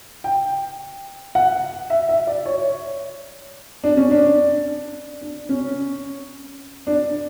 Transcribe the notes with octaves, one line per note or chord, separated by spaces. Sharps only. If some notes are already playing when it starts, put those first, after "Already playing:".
G5
F#5
E5
E5
D5
C#5
D4
C#4
D4
D4
C#4
D4